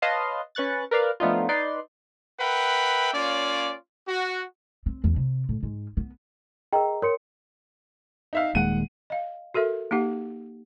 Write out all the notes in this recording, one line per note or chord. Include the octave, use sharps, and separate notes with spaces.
B4 C#5 D#5 F5 A5 C6
C#4 B4 C#6 F#6 A6
A#4 B4 D5 F5
F3 A3 B3 D4 D#4 F4
D#4 B4 D5 C6
A#4 B4 E5 F#5 G5 B5
A#3 C#4 F4 C#5 D5
F#4
C4
E2
C3
A2
G#2
B3
G#4 A#4 D#5 G5 A#5
A#4 C#5 C6 C#7
D#4 E5 F5
D#1 D#2 G#3 F#5 D#7
D#5 F5
F#4 A4 A#4 E5
A#3 D#4 G4 F#5